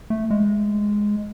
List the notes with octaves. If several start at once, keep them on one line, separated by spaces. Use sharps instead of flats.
A3
G#3